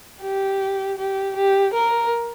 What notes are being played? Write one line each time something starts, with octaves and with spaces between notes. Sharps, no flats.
G4
G4
G4
A#4